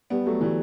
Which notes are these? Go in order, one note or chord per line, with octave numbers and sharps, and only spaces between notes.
G3 B3
F#3 A3
E3 G3